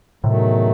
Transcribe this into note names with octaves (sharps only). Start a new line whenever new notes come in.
E2 A2 C3 D#3 F#3 A3